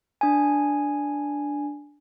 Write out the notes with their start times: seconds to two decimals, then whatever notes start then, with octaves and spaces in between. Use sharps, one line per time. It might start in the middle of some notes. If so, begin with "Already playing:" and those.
0.21 D4 G#5